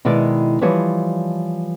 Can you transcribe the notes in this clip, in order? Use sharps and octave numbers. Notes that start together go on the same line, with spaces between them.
B2 D#3 G#3 E4 D5
E3 F3 G3 C#5 D#5